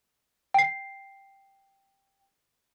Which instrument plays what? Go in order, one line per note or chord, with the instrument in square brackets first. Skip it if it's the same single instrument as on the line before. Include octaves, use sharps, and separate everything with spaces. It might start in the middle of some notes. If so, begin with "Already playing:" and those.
[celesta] G5 C7